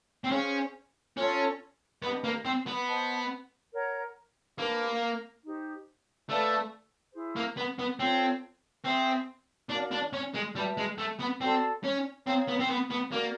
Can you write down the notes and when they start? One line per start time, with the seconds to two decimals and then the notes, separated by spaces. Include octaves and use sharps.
0.24 C4
0.31 C#4 G#4 C5 F5
1.17 C#4 F4 A4 C#5
2.03 B3 D4 G4 B4 D#5
2.24 A#3
2.45 C4
2.67 B3
2.87 C5 D#5 F#5 A5
3.73 A#4 C#5 F#5 A#5
4.58 A#3 D4 G4 B4
5.44 D#4 G4 C5
6.29 A3 B4 D5 F5 A5
7.14 E4 G#4 C5
7.36 A#3
7.57 B3
7.79 B3
7.99 C4 F4 A4 C#5
8.85 C4 G#4 C5 E5 G5
9.70 D4 F#4 A#4 D5 F5
9.92 D4
10.13 C#4
10.34 G#3
10.55 G3 F#4 B4 E5 A5
10.77 G#3
10.98 A3
11.20 B3
11.40 C4 F#4 A4 D5
11.84 C#4
12.26 C4 G#4 C#5 F5 A#5
12.48 B3
12.59 C4
12.70 B3
12.90 B3
13.11 A#3 F#4 A#4 D5